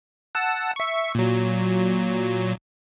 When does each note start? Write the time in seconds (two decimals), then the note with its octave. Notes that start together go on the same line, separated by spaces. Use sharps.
0.35 F#5 A5 E6
0.76 E5 C#6
1.15 A#2 F#3